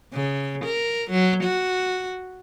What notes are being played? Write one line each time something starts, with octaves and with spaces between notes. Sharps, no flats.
C#3
A#4
F#3
F#4